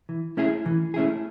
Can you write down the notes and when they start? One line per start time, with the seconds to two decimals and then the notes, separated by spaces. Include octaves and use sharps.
0.09 E3
0.37 A3 C#4 E4 G#4
0.66 E3
0.94 A3 C#4 E4 G#4